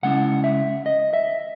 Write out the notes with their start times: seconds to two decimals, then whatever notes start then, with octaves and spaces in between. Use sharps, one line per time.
0.03 C#3 G#3 C#4 E4 F#5
0.44 E5
0.86 D#5
1.14 E5